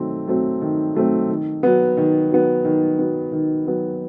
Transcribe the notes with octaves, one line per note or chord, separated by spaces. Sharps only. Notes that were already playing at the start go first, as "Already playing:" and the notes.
Already playing: D#3 F#3 A3 C4
F#3 A3 C4
D#3
F#3 A3 C4
D#3
F#3 B3
D#3
F#3 B3
D#3
F#3 B3
D#3
F#3 B3